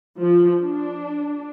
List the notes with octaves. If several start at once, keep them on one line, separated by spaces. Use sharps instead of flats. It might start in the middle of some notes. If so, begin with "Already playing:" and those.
F3
D4